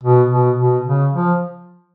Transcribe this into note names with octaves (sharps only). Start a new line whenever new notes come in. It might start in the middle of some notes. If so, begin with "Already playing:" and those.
B2
B2
B2
C#3
F3